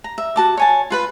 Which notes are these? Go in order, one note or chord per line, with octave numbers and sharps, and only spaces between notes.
A#5
E5
F#4 A5 D6
C#5 G#5 A5
F4 B4 B5